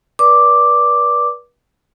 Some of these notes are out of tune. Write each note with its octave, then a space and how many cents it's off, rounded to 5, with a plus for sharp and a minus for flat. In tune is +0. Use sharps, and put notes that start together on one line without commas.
B4 -35 D5 -20 D6 +0